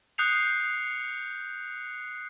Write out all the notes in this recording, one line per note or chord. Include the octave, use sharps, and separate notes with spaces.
D#6 F#6 G6 C7 C#7 F7